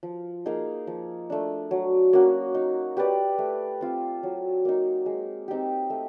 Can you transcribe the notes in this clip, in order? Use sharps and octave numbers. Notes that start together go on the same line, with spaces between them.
F3
A#3 D#4 G#4
F3
A3 D4
F#3
A#3 C#4 F#4
D#4
G4 B4 D5
A3
C4 F4
F#3
A#3 D#4
G#3
C4 D#4 G4
A3